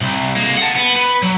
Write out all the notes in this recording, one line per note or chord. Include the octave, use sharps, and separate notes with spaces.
C2
G#3 A#3
F#5 A5
B3
B4
F#3